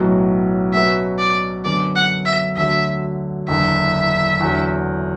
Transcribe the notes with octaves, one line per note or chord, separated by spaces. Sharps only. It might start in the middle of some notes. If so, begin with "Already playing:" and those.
Already playing: B1 A2 F#3 B3 F#4
B2 F#3 C#4 F#4 B4 E5
D5
F#2 D3 F#3 B3 D5
F#5
E5
D2 D3 F#3 E5
F#1 E2 D3 E5
E2 D3 F#3